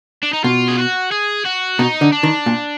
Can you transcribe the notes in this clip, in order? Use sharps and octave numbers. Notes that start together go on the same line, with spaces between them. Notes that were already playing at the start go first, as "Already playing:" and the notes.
D4
D#4
B2 F4
G#4
F#4
G#4
F#4
B2 D#4
D3
D4
D#3
A#2